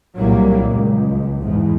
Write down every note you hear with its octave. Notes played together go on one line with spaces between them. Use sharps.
C2 A#2 F#3 G3 A#3
C#2
E2 G#2